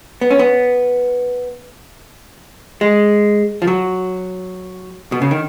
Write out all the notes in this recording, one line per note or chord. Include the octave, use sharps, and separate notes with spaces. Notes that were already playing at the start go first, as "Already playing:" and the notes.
B3
C#4
B3
G#3
F3
F#3
B2
C#3
D#3